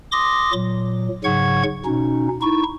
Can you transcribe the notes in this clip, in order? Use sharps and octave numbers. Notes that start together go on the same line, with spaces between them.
C6 D6 D#6 A#6
A#2 F#3
G#2 C#3 F#3 F#5 C#6 G#6
B2 C#4 D#4
D#4 E4 C#6